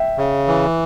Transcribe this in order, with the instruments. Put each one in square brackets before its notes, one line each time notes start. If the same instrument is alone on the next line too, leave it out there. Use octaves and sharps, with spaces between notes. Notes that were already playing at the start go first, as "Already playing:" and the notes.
Already playing: [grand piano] E5 G5
[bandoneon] C#3
E3